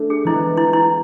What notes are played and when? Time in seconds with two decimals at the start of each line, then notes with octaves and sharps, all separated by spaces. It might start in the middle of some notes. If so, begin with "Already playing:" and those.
Already playing: A3 D4 A4
0.10 G#4
0.24 E3 G#3 B3 E4
0.57 E4
0.73 E4